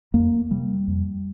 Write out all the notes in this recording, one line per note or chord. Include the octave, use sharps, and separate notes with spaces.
F2 A#3
C3 G3
F2